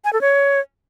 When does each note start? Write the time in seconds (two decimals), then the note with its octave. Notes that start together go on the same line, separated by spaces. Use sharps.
0.05 G#5
0.13 A4
0.21 C#5